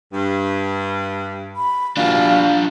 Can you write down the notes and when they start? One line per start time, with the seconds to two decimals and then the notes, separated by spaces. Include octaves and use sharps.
0.13 G2
1.56 B5
1.97 G2 B2 E3 D4 F4 F5